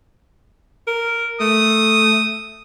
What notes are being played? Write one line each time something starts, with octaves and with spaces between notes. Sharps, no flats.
A#4
A3 D#6